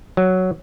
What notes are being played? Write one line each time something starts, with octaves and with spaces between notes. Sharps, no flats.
F#3